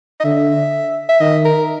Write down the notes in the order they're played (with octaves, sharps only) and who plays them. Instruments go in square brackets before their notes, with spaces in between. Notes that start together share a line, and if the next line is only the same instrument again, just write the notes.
[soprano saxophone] D#5
[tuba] D3 [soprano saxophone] E5
[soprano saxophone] E5
[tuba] D#3 [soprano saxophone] D#5
[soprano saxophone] A#4